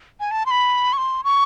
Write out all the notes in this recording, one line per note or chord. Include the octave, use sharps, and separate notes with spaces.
G#5
A5
C6
B5
C#6
C6
C#6